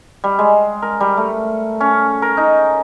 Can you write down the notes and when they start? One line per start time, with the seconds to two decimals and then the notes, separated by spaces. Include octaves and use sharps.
0.24 G3
0.39 G#3
0.82 A#4
1.00 G3
1.17 A3
1.81 C#4
2.22 A#4
2.37 D#4